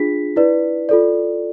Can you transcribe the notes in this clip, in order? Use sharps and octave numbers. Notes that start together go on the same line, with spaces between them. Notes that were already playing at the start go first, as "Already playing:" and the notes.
Already playing: D4 F4 G#4 B6
E4 B4 D5
F4 A4 D5